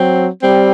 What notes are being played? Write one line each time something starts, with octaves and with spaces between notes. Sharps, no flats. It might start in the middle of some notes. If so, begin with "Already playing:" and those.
Already playing: F#3 C4
G3 C4